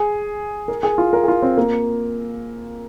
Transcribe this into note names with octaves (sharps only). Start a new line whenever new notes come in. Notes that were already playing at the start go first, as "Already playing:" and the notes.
Already playing: G#4
A#4
G#4
F4
A#4
G#4
F4
C4
A#3